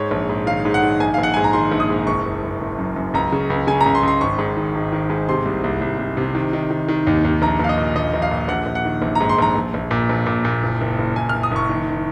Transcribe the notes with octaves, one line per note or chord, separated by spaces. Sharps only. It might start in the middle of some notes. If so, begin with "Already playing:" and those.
Already playing: G#2 C#5
A#1
G#2
D#3 F5
G#2
F#5
D#3
A#1 G#5
A#1 F5
F#5
G#2 G#5
A#5
D#3 C6
A#1
D#6
G#2
F#1 C#6
F#1
F#1
F#1
F#2
F#2
C#2 A#5
C#3
C#2
C#3 G#5
A#5
C#2
C6
C#2
C6
G#1 C#6
G#2
D#3
G#1
D#3
G#2
C3 C6
C2
C2
C2
C2
C3
D#3
D#3
D#3
D#3
D#2
D#2
A#1 A#5
A#1 F5
D#5
A#2
A#1 D#5
A#1
F5
A#2
A#1 F#5
A#1
F#5
D#3
A#1
A#5
G#2
C6
A#1 A#5
A#1
A#1
A#2
A#1
A#2
A#2
F#1
F#1
F#1
F#1 G#5
F#1 F6
D#6
F#1 C#6
D#3
D#3